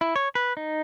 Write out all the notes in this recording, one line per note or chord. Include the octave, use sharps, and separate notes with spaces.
E4
C#5
B4
D#4